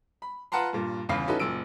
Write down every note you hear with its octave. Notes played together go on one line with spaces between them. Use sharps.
B5
F4 B4 F#5 A5 A#5 C6
G2 A#2
G1 E2 C#3 F5 B5
C#4 D#4 E4 F#4 A4 B4
F#1 A#2 E6 D7